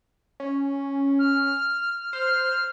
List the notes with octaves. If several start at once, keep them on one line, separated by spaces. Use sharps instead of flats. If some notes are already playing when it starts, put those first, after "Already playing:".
C#4
F6
C5 F6